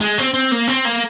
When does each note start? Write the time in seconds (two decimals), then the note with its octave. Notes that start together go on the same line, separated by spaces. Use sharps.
0.01 G#3
0.18 C4
0.34 C4
0.52 A#3
0.68 C4
0.85 A#3